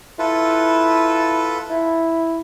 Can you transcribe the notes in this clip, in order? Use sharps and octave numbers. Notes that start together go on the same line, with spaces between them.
E4 F4 A4 B4
E4